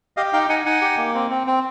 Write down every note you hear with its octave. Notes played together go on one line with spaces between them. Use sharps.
G4 D#5 F5
D#4 F5 G5
D#4 F#5 G#5
D#4 F#5 G#5
G4
A#3
C4
C4
C4